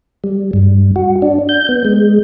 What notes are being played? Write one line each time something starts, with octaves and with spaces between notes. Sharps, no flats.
G3
G2
F#4
D4
G6
B3
G#3